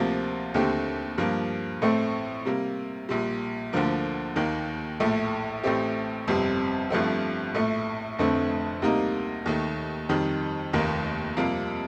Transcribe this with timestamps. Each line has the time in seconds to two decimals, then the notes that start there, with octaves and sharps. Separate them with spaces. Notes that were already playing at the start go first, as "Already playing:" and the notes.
Already playing: D2 C3 F3 A#3 F4
0.54 D#2 D3 A3 C4 G4
1.18 G2 F3 A#3
1.82 A1 A2 A3 C4
2.45 C3 G3 A#3
3.09 A#1 A#2 G3
3.73 D2 D3 F3 A#3
4.36 D#2 D#3 A#3
5.00 A#1 A2 A3
5.64 A1 A2 A3 C4 G4
6.28 G1 F2 C3 G3 C4
6.90 G1 G2 F3 A3 C4
7.55 A#1 A2 A3
8.19 F1 F2 D3 A3 C4
8.82 D2 C3 G3 A#3 D#4
9.46 D#2 D#3 A3
10.09 F2 D#3 G3
10.73 F1 D#2 D#3 A#3 D#4
11.37 F2 C3 G3 A#3 F4